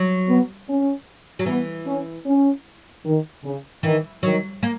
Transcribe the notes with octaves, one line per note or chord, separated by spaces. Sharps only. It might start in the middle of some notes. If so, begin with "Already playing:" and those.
Already playing: F#3
B3
C#4
F#3
E3 B3
C#4
C#4
D#3
C#3
D#3 E3
D#3 F#3
A#3